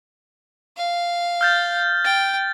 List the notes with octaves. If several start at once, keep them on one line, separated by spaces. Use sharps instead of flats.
F5
F6 G6 A6
G5 A6